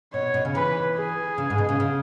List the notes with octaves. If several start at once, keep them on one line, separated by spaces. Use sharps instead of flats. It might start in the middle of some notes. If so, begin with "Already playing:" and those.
B2 C#5
B2
C#3
E3 B4
G#4
C#3
G#2
B2
C#3
C#3